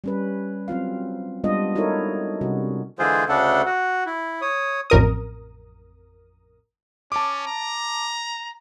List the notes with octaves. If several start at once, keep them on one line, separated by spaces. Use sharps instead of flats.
G3 C#4 B4
F#3 C4 F4 F5
G3 G#3 B3 D4 F4 D#5
D#4 E4 F#4 A4 A#4 C#5
C3 G3 C#4 F#4
D3 E3 G#3 F4 G#4 C5
D2 C#3 A3 D4 A4 F#5
F#4 F#5
E4
C#5 D#6
A1 F2 A#4 D#6
C#4 A5 D6
A#5